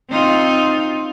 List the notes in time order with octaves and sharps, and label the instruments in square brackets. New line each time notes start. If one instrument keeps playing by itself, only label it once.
[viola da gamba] C4 D#4 F4